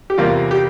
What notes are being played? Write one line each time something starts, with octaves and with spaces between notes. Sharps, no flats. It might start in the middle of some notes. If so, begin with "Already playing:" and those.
G4
E2 C3 G3 A#3 F4
G4